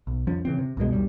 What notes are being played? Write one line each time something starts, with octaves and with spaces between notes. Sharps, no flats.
B1
F2 F3 C#4
C#3 E3 C4
C3
C2 F#2 B2 G#3
E1 B1 G3